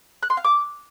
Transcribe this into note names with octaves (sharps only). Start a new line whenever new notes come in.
F#6
C6
F5
D6